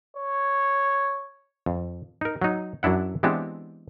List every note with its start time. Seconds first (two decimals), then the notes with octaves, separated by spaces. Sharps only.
0.17 C#5
1.66 F2
2.21 D#4 A#4
2.42 F#3 D#4
2.83 F#2 F#3 D4 E4 F#5
3.23 E3 G#3 B3 C4 D4 G4